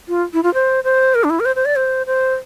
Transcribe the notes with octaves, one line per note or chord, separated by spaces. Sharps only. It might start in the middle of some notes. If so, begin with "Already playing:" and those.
F4
E4
F4
C5
C5
A#4
D4
E4
A#4
C5
C5
D5
C5
C5